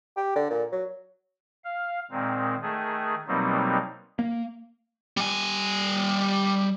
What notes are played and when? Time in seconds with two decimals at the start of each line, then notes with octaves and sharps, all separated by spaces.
0.17 G4
0.36 D3
0.50 A#2
0.72 F#3
1.65 F5
2.11 A#2 D#3 G#3 C4
2.62 D#3 A3 G#4
3.28 B2 F#3 G3 A#3 C4 D#4
4.19 A#3
5.17 G3 G#5